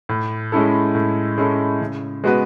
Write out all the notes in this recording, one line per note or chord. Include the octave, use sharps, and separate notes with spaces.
A2
G#3 C#4 E4 A4
A2
G#3 C#4 E4 A4
C#3
G#3 B3 F#4 B4